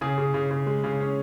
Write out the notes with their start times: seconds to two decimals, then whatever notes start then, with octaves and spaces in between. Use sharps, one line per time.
0.01 C#3 G#4
0.18 C#3
0.34 C#3
0.51 C#3
0.66 G#3
0.84 C#3
1.00 C#4